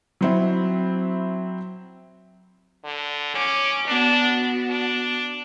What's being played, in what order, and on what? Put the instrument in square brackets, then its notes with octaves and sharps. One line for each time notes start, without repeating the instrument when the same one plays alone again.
[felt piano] F#3 C4 E4
[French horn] D3
[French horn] C#4 [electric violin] D6
[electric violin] B3 F#4 [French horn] D4
[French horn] D4